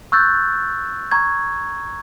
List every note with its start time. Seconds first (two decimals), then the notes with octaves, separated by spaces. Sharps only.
0.12 C#6 E6 F#6 G6 A6
1.11 A#5 C#6 G#6